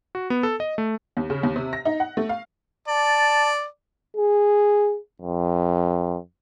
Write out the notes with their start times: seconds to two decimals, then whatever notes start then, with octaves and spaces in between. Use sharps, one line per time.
0.15 F#4
0.30 B3
0.43 A4
0.60 D#5
0.78 A3
1.17 D#2
1.30 C#3
1.43 D#2
1.56 C3
1.73 A#6
1.85 D#4
2.00 F#5
2.17 A3
2.29 F5
2.88 D5 A5
4.17 G#4
5.22 F2